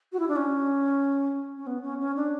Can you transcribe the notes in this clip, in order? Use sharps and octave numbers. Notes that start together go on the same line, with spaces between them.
F#4
E4
D4
C#4
C#4
B3
C#4
C#4
D4